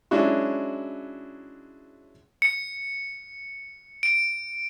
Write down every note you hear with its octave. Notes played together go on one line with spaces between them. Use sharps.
F#3 G#3 C#4 D4 E4 F#4
C#7
D7